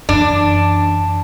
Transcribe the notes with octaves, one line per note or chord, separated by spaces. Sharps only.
F#2 E3 D4